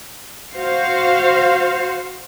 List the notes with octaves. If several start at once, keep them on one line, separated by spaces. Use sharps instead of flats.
F#4 C5 F5